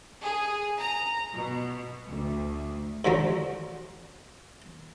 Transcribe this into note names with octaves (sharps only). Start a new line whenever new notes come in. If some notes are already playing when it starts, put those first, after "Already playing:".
G#4
A#5
B2
D2
G#2 D3 F3 F#3